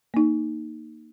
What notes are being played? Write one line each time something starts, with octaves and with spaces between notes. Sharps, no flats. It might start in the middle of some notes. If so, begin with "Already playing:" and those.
A#3 D#4